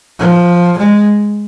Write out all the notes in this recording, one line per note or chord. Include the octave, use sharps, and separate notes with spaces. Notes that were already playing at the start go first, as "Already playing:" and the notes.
F3
G#3